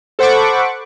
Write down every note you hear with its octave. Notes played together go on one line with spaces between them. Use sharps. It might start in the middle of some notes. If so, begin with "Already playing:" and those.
A4 C5 F#5 B5 C#6 D6